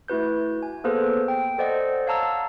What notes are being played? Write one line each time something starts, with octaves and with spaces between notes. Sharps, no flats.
A3 E4 F#4 B4 G6
G#5
A#3 B3 G#4 A4 B4 C5
G5
A4 C5 D5 D#5 F#5
C#5 F5 F#5 A5 A#5 E6